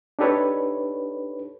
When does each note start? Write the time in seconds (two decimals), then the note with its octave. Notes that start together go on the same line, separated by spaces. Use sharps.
0.19 D4 D#4 G4 A4 B4 C#5